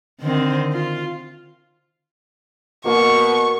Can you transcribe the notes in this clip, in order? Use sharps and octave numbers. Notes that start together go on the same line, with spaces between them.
D3 D#3 C4
F4
B2 A#3 F#4 C#6